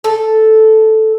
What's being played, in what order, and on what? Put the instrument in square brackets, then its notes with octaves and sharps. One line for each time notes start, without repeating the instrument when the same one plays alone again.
[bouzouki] A4